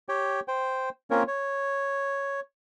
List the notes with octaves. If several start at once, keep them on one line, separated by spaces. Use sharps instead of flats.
G4 C#5 G5
C5 G5
A#3 C4 C#4 F4 A#4 C#5
C#5